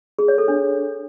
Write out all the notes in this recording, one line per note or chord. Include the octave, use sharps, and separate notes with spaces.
G#4
C#5
A4
D4